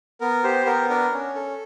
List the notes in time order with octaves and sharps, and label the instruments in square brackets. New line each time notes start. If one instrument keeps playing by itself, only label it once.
[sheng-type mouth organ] B3 A#4
G4 C5
B3 A#4
D4 A#4
C#4
A4